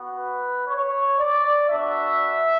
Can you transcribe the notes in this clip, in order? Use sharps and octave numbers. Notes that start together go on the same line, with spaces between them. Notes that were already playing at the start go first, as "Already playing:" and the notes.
Already playing: B3 F#4
B4
C#5
D5
B3 D4 F#4 E5